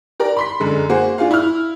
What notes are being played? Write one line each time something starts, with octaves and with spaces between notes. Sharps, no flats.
G4 A#4 D5
B5 C6 B6
F#2 D3 G#3
A#3 F#4 G#4 C5 F#5
D4 F4 G#4 F5
E4 F6